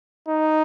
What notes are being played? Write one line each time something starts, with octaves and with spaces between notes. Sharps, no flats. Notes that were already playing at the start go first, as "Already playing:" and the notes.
D#4